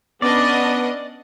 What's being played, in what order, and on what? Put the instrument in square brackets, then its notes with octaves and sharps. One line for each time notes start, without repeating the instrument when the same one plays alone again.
[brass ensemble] B3 [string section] C#4 D4 D#5 [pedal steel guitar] D5